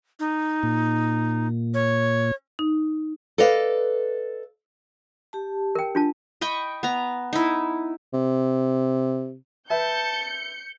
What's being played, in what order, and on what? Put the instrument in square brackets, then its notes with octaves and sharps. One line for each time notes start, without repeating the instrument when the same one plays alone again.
[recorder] D#4
[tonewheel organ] A#2
[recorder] C#5
[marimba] D#4
[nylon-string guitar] A4 B4 D5 D#5 F5
[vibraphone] G4 A5
[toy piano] A#4 G5
D4 F4 A5
[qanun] D#5 G5 B5 C#6
B3 A#5
D#4 E4
[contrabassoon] C3
[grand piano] B4 E5 [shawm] A5 [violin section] G6 C#7